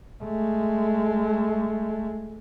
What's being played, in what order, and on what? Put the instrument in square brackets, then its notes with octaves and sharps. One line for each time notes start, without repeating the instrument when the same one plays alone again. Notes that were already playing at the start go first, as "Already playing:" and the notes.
[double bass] G#3 A3